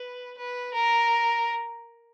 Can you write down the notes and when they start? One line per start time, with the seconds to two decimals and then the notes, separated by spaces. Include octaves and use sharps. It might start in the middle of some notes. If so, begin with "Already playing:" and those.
Already playing: B4
0.38 B4
0.74 A#4